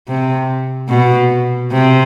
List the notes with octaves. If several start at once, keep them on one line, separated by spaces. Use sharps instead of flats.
C3
B2
C3